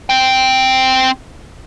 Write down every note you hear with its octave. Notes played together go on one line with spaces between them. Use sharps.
C4 G5